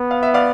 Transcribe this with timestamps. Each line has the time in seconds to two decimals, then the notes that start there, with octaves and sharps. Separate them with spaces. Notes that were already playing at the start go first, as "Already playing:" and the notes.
Already playing: B3
0.11 F5
0.23 E5
0.34 D5 F5